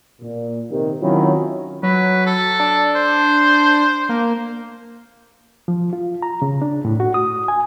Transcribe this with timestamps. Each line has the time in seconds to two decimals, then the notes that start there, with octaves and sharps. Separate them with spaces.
0.22 A#2
0.70 C3 D#3
1.01 D#3 F#3 C4 C#4 E4 F4
1.83 F#3 B4
2.26 A4
2.60 D4
2.96 C5
4.09 A#3
5.68 F3
5.93 F4
6.22 A#5
6.42 C#3
6.62 D4
6.85 A2
7.00 F#4
7.14 D#6
7.48 G#5